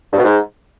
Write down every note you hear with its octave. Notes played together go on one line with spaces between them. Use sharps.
G2
B2
G#2